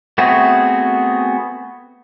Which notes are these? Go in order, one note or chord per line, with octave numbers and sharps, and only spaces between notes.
A3 B3 C4 F#4 G#4